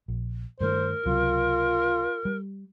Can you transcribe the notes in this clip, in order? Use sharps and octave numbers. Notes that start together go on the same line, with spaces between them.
A#1
G2 D#3 A3 A#4 C5
C#2 C3 F#3 F4
G3